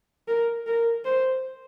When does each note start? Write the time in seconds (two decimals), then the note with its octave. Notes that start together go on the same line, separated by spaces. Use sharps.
0.28 A#4
0.67 A#4
1.05 C5